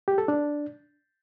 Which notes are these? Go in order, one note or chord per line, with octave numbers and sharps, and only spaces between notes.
G4
A4
D4